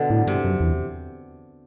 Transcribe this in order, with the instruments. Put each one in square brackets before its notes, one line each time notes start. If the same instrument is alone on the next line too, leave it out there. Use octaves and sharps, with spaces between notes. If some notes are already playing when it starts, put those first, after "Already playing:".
Already playing: [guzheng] B2 D3
[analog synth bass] A2
[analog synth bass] G2 [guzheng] C3
[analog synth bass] F#2
E2